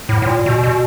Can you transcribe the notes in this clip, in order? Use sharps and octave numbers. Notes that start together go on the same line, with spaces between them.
A2
A2
A#2
B2
B2